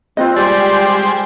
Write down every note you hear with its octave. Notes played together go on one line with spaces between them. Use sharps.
C4 F4 B4 D#5
G3 G#3 G4 C5 D5